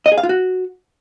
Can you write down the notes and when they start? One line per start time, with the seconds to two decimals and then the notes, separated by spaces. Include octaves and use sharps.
0.06 D#5
0.12 G#4
0.18 F5
0.23 F4
0.29 F#4